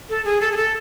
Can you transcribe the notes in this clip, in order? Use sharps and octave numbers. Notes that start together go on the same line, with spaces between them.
A4
G#4
A4
G#4
A4